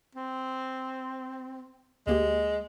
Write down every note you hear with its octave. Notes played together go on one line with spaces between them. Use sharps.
C4
D2 G#3 A#3 G4